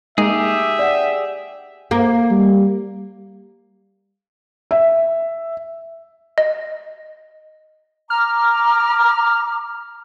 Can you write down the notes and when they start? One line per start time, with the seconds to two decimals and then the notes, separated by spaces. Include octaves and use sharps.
0.18 G#3 A#3 D#4 G4 G#4 E5
0.79 D5 F#5
1.91 A#3
2.30 G3
4.71 E5
6.38 D#5
8.10 A#5 D6 F6